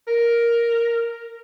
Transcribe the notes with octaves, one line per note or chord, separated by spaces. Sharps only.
A#4